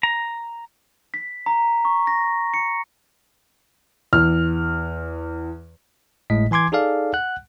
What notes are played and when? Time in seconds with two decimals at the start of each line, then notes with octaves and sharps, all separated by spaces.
0.03 A#5
1.14 B6
1.46 A#5
1.85 C#6
2.07 A#6
2.54 C#7
4.13 E2 F6
6.30 G#1 A2 G#3 D#5 B6
6.51 E3 G#5 C6 D6 G#6
6.72 D#4 G#4 A4 D5 F5
7.14 F#5 F#6